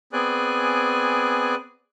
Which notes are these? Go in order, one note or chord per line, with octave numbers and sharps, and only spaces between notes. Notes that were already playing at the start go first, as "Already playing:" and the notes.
B3 C4 G#4 D5 G#5 F#6